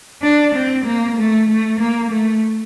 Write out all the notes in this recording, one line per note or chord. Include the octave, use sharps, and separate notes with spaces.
D4
C4
A#3
A3
A3
A#3
A3